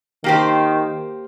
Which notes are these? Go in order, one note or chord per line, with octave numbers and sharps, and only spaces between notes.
D#3 A#3 G4 C5